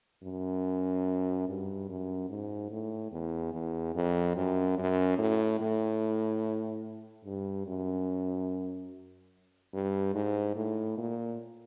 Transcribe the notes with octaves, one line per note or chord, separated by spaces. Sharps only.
F#2
G2
F#2
G#2
A2
E2
E2
F2
F#2
F#2
A2
A2
G2
F#2
G2
G#2
A2
A#2